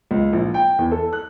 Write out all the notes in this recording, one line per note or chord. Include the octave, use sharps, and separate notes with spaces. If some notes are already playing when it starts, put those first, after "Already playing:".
C#2
A#1
G5
E2
A4
F#6